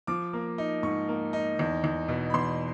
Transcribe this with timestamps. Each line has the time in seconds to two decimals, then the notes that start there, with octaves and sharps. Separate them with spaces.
0.07 F3 D6
0.33 A#3
0.58 D#4
0.83 G#2 C#6
1.09 A#3
1.33 D#4
1.59 E2
1.84 E2
2.08 B2
2.30 B5
2.34 E2 C6